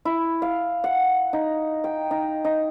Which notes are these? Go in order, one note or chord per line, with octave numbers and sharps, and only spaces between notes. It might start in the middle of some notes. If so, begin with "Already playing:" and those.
E4
F5
F#5
D#4
G5
D#4
D#4